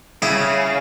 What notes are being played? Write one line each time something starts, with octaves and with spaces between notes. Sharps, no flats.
C#3 E4 G#4 G5